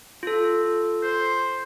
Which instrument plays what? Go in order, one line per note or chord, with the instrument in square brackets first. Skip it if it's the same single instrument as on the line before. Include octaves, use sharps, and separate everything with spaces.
[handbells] F4 A4
[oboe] C5